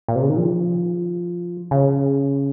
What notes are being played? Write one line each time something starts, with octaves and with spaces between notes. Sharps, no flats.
A#2
C3
C#3
D#3
F3
C#3